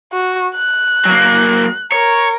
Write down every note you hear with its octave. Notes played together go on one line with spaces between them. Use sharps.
F#4
F#6
F#3 A#3
A#4 C#5